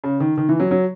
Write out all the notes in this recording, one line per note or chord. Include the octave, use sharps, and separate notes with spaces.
C#3
D#3
D#3
E3
F#3
F#3